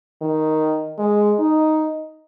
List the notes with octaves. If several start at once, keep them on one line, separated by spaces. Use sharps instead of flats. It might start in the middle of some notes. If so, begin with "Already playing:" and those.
D#3
G#3
D#4